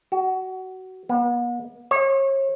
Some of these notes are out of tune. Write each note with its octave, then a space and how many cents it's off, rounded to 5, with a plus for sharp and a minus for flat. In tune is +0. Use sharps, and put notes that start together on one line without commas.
F#4 +20
B3 -45
C#5 -35